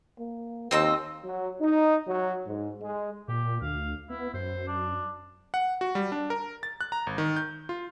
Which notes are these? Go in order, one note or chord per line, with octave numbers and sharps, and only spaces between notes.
A#3
D#2 C4 D#5 E6
F#3
D#4
F#3
G#2
G#3
A#2 G4
D2 F5
B3 E4
F#2 C5
D4
F#5
F#4
G3
D4
A#4
A6
F#6
A#5
G#1
D#3
G6
F4